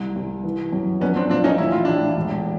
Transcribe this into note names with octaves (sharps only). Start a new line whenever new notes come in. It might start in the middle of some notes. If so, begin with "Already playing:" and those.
Already playing: C2
C2
E3
F#2
A#1 B3 C#4
C4 D4
A#2 C4 D4
C#4 D#4
A1 E4
F4
A1 D4 E4
E1